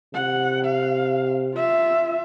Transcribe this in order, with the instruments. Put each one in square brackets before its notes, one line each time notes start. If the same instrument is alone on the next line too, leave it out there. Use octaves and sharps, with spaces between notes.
[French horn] C3 [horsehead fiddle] F#5
[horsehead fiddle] F5
F4 E5